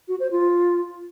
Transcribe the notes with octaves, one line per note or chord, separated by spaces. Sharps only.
F#4
C5
F4